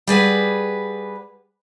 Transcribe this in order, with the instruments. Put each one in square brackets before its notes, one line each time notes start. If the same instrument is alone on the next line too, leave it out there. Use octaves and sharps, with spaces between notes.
[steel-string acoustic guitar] G3 G#4 B4 F#5